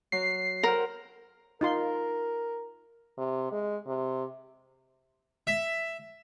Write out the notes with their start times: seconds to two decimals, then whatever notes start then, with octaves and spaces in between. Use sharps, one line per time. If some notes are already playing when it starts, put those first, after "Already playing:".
0.12 F#3 C7
0.63 A#4 C5 F#5 G5
1.61 D#4 F4 A#4 C6
3.18 C3
3.52 G#3
3.87 C3
5.47 E5